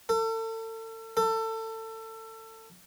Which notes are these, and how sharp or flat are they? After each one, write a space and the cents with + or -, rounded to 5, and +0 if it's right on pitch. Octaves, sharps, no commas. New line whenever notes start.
A4 +35
A4 +25